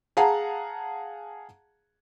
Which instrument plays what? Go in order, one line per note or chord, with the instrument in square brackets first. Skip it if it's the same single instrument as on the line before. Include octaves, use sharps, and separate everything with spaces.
[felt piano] G#4 F5 F#5 A5 A#5